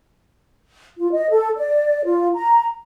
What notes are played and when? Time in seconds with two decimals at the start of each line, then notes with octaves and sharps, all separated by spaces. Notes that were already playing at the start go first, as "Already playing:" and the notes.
0.98 F4
1.12 D#5
1.30 A4
1.57 D5
2.05 F4
2.34 A#5